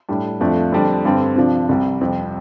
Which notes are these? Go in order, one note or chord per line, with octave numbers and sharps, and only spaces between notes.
A2 G3 D4
F2 F3 A3 D4
F2 D3 G3 D4
G2 D3 G3 C4
C3 F3 D4
C2 C3 G3
F2 C3 G3